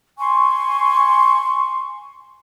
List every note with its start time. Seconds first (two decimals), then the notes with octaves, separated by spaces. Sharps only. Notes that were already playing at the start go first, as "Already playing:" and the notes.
0.18 G#5 C6 C#6